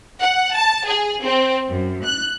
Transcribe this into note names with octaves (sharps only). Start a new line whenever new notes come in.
F#5
A5
G#4
C4
F#2
F#6